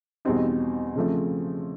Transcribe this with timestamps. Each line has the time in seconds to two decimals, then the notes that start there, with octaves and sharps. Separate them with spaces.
0.25 E2 B2 G3 C4 D#4
0.96 C#3 F3 A3 C4